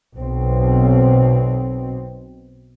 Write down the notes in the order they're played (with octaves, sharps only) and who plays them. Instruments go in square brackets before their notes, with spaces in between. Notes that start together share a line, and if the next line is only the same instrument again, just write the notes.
[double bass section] B1 B2 C4